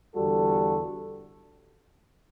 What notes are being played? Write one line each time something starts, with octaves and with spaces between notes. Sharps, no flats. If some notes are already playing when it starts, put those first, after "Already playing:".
E2 D3 G3 F#4 A4